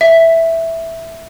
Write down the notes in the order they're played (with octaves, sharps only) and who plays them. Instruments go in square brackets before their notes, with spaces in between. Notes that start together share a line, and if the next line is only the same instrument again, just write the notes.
[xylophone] E5